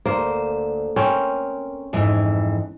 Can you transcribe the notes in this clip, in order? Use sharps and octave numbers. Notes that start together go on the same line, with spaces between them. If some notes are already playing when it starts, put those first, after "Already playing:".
D2 A#3 C5
C4 C#4 A#4
F2 G#2 E3